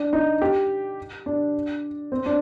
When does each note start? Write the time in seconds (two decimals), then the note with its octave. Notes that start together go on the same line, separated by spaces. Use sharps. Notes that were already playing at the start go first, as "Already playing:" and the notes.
Already playing: D4
0.13 D#4
0.41 G4
1.26 D4
2.12 C4
2.26 D4